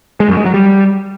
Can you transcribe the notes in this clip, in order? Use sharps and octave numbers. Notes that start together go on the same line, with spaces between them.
G#3
F#2
G#3
F#3
G3